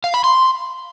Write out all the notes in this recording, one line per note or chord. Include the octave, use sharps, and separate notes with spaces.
F5
B5
C6